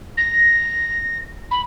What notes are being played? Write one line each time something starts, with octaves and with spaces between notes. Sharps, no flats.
A#6
B5